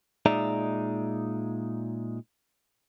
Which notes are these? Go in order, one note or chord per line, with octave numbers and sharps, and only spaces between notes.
A#2 G#3 D#4 D5 E5 A#5